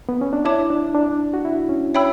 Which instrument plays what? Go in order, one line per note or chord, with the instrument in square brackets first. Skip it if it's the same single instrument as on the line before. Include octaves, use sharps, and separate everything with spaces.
[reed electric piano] B3
C#4
D4
[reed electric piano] E4 [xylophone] C#5 E5 A5 D6
[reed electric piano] D4
D4
F#4
E4
C#4
[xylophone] C#5 E5 G5 B5 E6